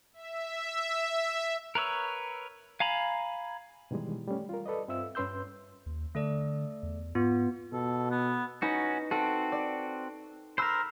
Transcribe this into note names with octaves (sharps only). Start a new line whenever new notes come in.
E5
A#4 B4 C#5 E6
F5 G#5 A#5 B5
B2 D#3 E3 G3 G#3
G3 A3 C#4
F4 A#4
A4 B4 D5 D#5
G2 C4 F4 E5 E6
G2 C#4 B4 C6 E6 G6
D#2
D3 A3 A4 D5
E2
G#2 B3 F4
B2 A4
B3
C#4 D#4 F#4 B4 A#6
C4 F#4 A4
D5
A#4 C5 B5 E6 F#6